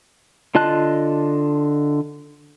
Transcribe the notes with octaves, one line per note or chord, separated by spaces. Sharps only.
D3 F4 D#5 A5 F#6